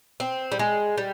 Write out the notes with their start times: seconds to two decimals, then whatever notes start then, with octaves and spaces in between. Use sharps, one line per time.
0.20 C4
0.52 G3
0.59 G#3
0.98 G3